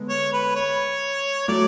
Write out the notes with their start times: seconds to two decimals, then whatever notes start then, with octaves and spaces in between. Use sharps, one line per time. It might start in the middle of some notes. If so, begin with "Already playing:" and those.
Already playing: D3 G#3 B3
0.09 C#5
0.33 B4
0.55 C#5
1.48 F#3 A3 D5